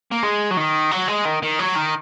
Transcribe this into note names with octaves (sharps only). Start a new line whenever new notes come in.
A#3
G#3
F#3
D#3
F#3
G#3
D#3
D#3
F#3
D#3